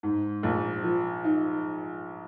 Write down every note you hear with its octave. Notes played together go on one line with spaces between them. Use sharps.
G#2
A#1
F3
D#4